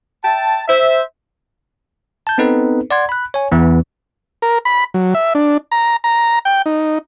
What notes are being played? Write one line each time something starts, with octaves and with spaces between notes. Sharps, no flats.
E5 G5 A5
C5 E5
A5 G6
B3 C4 D#4 A4 B4
D5 F#5 C6 G#6
B5 F#6
C#5 G#5
E2 E3 B3
A#4
B5
F#3
E5
D4
A#5
A#5
G5
D#4